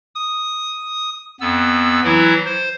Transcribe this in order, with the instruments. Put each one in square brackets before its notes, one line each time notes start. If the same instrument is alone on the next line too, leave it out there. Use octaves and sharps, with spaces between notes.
[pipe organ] D#6
F2 B3 E6
E3 F#3 E4
C5